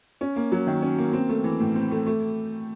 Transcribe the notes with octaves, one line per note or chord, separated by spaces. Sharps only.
C#4
A#3
F#3
D#3
C#4
A#3
C4
A3
E3
A2
C4
A3
A3